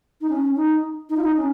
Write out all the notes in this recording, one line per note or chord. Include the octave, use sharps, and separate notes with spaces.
D#4
C#4
D#4
D#4
F4
D#4
C#4